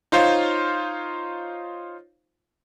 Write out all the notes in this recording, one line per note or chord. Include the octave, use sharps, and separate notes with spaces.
D#4 F4 C5 C#5 F5